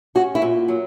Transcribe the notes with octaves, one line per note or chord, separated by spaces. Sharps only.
C#4 F#4
E4
A#2
F#3